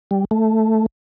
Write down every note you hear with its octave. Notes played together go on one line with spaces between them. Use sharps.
G3
A3